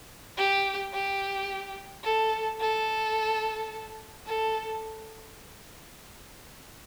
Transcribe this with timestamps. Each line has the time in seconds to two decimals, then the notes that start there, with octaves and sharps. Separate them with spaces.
0.37 G4
0.93 G4
2.04 A4
2.60 A4
4.26 A4